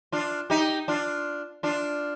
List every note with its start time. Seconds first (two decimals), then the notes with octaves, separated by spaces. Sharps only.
0.12 D4 F4
0.50 D#4 G4
0.88 D4 F4
1.63 D4 F4